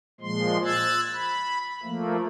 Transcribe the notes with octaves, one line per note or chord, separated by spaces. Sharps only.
A#2 F3 G#3 C6
E6 F#6 G#6 A6
B5
F3 A3 A#3